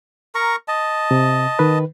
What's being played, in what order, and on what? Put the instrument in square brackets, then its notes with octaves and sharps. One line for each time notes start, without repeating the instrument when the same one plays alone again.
[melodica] A#4 A#5 C#6
D#5 A5
[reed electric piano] C3
D#3 B4